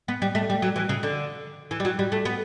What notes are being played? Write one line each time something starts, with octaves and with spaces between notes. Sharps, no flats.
B3
G3
A3
G3
F#3
E3
C#3
D3
E3
G3
F#3
G3
A3
B3